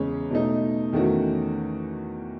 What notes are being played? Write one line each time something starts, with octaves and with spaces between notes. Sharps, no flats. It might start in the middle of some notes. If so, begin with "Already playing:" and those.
Already playing: E2 C#3 G#3 C#4
B2 A3 D#4
E2 D#3 A3 C#4 F#4